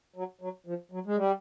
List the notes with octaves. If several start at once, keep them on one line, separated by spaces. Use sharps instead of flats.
F#3
F#3
F3
F#3
G#3
G3